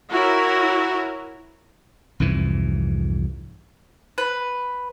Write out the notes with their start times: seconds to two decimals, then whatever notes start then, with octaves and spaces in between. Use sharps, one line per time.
0.10 E4 F#4 A#4 C#5
2.20 C2 F2 G#2 E3
4.18 B4